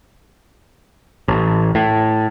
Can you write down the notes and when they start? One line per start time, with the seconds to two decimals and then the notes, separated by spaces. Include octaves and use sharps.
1.28 A1
1.75 A2